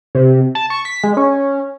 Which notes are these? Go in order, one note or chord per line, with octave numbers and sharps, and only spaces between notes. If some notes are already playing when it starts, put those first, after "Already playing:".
C3
A5
C#6
B6
G#3
C#4